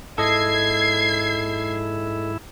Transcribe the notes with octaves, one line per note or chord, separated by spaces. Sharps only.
G#2 E4 A4 D#5 G#6 C7